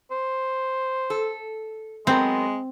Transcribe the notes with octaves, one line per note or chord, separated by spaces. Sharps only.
C5
A4
F#3 G#3 B3 C4 A#4